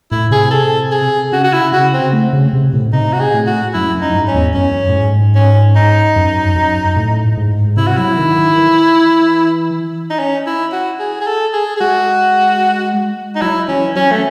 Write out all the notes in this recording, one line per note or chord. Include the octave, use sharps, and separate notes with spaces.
A2 E4
C3 G#4
A4
G#4
C#3 F#4
F#4
E4
C#3 F#4
C4
A3
C#3
C3
A2
C3 D#4
F#4
G#4
A2
F#4
F#2 E4
F#2
D#4
G#2
C#4
E2
F#2 C#4
A2
G#2
C#4
D#4
F#2
F#2
A2
G#2
C3 E4
F#4
F#3 E4
D#3
D#3
E3
D#4
C#4
E4
F#4
G#4
G#4
A4
G#4
G#4
G#3 F#4
D#4
F#3 E4
E3 C#4
F#3 C#4
A3